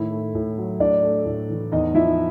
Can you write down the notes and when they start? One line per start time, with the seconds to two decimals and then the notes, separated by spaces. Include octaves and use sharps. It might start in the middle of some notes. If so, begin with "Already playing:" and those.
Already playing: A2 D#3 E4
0.11 A3
0.35 A2
0.58 F#3
0.80 A2 D4 D5
1.03 A3
1.25 A2
1.49 E3
1.72 E2 D#4 D#5
1.94 F3 E4 E5